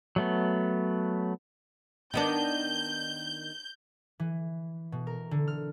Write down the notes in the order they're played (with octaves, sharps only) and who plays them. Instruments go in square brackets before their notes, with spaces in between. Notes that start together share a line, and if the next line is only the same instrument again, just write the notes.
[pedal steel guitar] F#3 A3 B3
[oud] D#3 B3 D4 [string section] G6
[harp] E3
B2
A#4
D3
F6